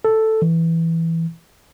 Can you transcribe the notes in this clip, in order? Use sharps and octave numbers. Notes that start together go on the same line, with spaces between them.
A4
E3